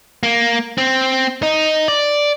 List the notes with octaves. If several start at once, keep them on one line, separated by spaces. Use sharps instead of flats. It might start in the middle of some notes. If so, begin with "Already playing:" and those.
A#3
C4
D#4
D5